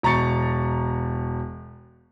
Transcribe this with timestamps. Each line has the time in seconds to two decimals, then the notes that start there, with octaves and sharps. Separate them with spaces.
0.03 E1 A#5 C#6 A6 C#7